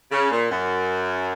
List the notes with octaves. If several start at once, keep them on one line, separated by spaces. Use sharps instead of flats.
C#3
A#2
F#2